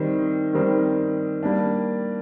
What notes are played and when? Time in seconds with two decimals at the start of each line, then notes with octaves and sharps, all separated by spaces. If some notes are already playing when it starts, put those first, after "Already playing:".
Already playing: D#3 G3 C4 D#4 A#4
0.53 D#3 G3 C4 D#4 A#4
1.43 G3 A#3 D4